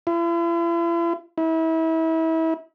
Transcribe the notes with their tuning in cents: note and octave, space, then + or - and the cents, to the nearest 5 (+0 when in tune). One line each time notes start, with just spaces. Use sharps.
E4 +45
E4 -30